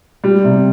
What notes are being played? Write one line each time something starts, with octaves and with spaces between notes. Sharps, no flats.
G3
C3